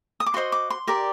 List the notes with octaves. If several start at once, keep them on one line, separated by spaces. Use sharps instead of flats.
D#6
D6
F#4 C5 D#5 C6
D6
C6
G4 A#4 D5